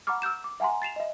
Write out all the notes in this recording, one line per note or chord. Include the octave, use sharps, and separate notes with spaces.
F#5 A#5 B5 C#6 D6 F6
E6 F6 G6 E7
D6
E5 F#5 G#5 A#5 C6
A6 C7 E7 F7
D#5 E5